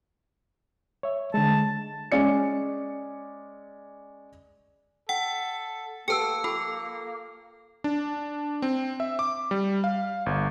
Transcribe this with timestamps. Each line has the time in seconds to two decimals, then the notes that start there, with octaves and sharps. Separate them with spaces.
1.03 C#5 E5
1.34 D3 G#3 A5
2.12 G#3 C#4 D5 C#7
5.09 A4 F#5 G5
6.08 A#3 G4 A4 B4 G5 A5 E6 C#7
6.44 F4 A4 C#6
7.84 D4
8.62 C4
9.00 E5
9.19 D6
9.51 G3
9.84 F5
10.26 G1